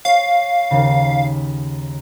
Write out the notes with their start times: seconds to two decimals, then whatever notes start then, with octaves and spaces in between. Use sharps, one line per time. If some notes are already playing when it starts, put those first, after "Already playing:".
0.05 C#5 F5
0.71 D#2 C#3
1.09 B6